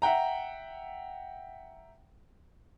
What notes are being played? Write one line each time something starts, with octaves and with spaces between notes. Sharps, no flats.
E5 F#5 G5 A#5